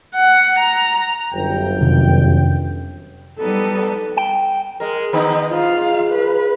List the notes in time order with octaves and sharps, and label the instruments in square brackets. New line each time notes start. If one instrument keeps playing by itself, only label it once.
[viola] F#5
A#5
[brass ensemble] G1 F#2 G5
[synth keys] F2 C3 D#3
[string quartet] G3 B3 D#4 [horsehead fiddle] A4
[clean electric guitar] G5
[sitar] G#3 A#4
[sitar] D#3 B3 D#4 [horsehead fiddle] D#5
[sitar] G#2 [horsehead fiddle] F4 F5
[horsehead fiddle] B4